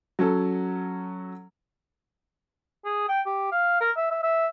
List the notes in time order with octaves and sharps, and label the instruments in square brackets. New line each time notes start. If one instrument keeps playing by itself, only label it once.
[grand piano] F#3 C#4 A4
[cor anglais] G#4
G5
G4
F5
A#4
E5
E5
E5